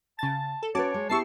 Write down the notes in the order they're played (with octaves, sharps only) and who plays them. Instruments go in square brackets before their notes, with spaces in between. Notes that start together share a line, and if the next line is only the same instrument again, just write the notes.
[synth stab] C#3 A6 [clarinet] A5
[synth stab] A4
[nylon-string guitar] C#4 B4 [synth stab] F#4 A5 D6 [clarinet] C#5
[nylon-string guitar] G#3
[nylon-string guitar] B3 E4 G4 [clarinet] A5 [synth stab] C#6 E6 C7